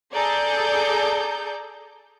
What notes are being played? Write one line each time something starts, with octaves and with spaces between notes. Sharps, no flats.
G#4 A4 D5 A#5 G6